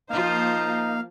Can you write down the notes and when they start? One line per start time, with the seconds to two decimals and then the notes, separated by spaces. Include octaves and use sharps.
0.10 F3 A#3 D#4 F4 C5 F5